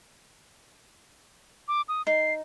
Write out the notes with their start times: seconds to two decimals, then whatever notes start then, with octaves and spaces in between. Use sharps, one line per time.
1.68 D6
1.88 D#6
2.07 D#4 C7